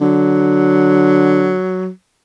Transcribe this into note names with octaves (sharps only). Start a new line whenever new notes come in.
D3 F#3